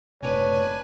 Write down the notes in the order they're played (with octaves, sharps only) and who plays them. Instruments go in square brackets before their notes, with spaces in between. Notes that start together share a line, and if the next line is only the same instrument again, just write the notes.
[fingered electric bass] F#1 A2 C3 [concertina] D4 G#5 [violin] B4 [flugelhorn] C#5